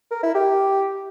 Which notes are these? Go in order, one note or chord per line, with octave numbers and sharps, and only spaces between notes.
A#4
E4
G4